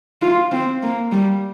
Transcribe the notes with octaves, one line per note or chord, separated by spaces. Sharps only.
F4
C4
A#3
G3